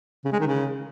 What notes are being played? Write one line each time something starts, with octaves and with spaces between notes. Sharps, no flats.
C#3
G#3
D#3
C#3